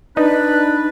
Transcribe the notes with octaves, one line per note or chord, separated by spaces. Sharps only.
D4 D#4 B4